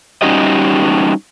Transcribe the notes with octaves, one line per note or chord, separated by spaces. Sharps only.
G3 C#4 D#4 F#4 G4 D#5